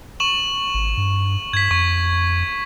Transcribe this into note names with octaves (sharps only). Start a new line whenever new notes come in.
C#6 E7 F#7
G#1
G2
G2 G#6 B6
F2 C#6